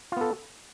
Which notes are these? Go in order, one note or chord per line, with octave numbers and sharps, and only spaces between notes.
B3 F4 A4